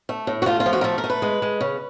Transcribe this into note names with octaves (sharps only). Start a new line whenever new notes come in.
A3
A2
F#4
A3 F4
F4
F3
F#4
A#4
A3 A4
A#4
A3
B4
G#3
G#3
C#3